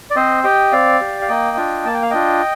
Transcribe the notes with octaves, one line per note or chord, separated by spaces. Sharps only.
D5
C4 C5 D#5
G4 D#5 G5
C4 D5 F5
G4
F5
A#3 D#5 G5
D4 F4
A#3 A5
G5
F5
D4 F4 D#5 G5